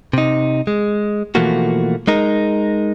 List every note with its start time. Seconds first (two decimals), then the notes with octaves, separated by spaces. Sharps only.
0.13 C3 D#4
0.67 G#3
1.35 B2 E3 F3 A3 A#3 F#4
2.07 G#3 D#4 A#4